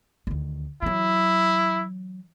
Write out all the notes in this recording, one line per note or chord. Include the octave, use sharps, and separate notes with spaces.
D2 D#3
E3 F#3 E4